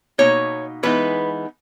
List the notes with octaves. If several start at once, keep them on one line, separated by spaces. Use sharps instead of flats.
B2 A#3 D#4 C#5
E3 G#3 B3 D#4 B4